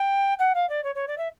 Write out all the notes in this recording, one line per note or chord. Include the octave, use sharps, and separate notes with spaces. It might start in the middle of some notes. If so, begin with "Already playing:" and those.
Already playing: G5
F#5
F5
D5
C#5
C#5
D5
E5